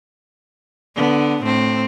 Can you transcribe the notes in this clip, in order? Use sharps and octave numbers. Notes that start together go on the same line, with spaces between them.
D3 B3
A2 C4